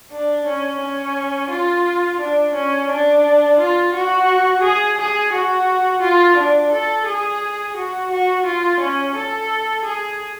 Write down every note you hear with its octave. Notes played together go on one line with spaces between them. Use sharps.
D4
C#4
C#4
F4
D4
C#4
D4
F4
F#4
G#4
G#4
F#4
F4
D4
A4
G#4
F#4
F#4
F4
C#4
A4
G#4